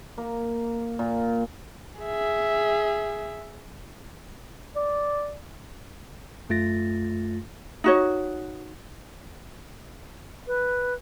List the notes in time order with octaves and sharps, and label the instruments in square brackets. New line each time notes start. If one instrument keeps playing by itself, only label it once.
[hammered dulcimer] A#3
A#2
[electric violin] G#4 E5
[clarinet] D5
[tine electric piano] F#2 A3 F4 A6 A#6
[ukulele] D#4 F#4 C#5
[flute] B4